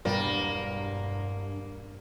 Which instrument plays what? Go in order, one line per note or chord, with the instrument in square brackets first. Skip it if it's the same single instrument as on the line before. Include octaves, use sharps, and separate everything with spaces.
[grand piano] E1 B3 A#4 [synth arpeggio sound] G2 [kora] G3 [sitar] A#3